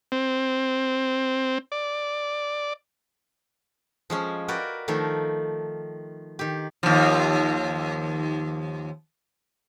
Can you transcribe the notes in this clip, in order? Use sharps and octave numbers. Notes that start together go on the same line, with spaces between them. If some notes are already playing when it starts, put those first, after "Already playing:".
C4
D5
F3 G#3 C#4
F#4 A#4 B4 D5 G5
D#3 F3 A3 A#4
D#3 G4
D#2 F3